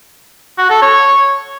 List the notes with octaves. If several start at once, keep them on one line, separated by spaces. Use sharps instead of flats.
F#4
A4
C#5